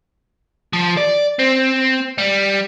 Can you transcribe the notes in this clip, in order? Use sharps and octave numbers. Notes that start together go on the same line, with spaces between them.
F3
D5
C4
G3